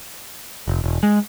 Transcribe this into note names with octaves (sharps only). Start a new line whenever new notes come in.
F1
E1
G#3